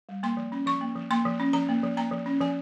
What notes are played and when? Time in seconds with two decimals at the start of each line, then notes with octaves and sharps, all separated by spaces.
0.09 G3
0.23 A#3 C6
0.37 F3
0.52 C#4
0.66 F3 C#6
0.81 A#3
0.95 F3
1.11 A#3 C6
1.25 F3
1.40 C#4
1.53 F3 A#5
1.69 A#3
1.83 F3
1.97 A#3 A#5
2.12 F3
2.26 C#4
2.41 F3 G#5